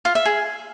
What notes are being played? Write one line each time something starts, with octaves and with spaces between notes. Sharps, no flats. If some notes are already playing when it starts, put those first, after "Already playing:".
F4
E5
G#4